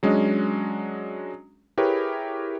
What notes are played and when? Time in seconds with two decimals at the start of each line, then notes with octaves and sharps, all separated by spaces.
0.03 F#3 G#3 C#4 D4 D#5
1.77 E4 G4 G#4 A#4 B4 C#5